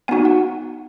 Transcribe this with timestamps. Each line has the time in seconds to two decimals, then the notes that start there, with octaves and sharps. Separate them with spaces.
0.08 B3 D#4 F#4 G#5
0.25 F#5